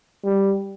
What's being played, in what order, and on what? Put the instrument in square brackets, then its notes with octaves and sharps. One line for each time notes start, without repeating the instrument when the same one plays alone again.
[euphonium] G3